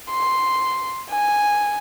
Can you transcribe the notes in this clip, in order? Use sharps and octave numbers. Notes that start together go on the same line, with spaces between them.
C6
G#5